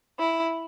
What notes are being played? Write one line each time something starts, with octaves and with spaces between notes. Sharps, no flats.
E4